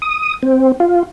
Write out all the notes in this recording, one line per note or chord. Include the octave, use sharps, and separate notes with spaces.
D#6
C4
F4